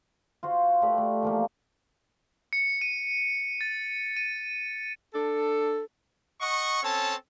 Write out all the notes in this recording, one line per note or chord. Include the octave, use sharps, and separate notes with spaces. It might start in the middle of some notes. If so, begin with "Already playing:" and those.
F4 F#4 C5
A3 G4 B4 D5
A3
E3 F3 A#3
C#7
D#7
A6
D#7
D4 A4
D#5 F#5 C#6
C4 C#4 A4 C#5 A5